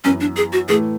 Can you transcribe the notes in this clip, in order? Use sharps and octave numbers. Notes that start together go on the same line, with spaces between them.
F#2 E3 B3 C#4
D4
G#4
F#4
A2 E3 A3 G#4